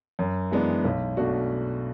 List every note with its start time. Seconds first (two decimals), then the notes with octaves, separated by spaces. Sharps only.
0.19 F#2
0.51 E3 G#3 B3 D4
0.85 B1
1.17 B2 A3 D4 F#4